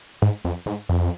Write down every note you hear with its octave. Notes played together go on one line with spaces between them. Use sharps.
G#2
F2
G#2
F2